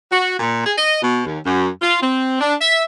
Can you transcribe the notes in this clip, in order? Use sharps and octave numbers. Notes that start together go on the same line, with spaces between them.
F#4
A#2
G#4
D#5
B2
D#2
F#2
F4
C4
D4
E5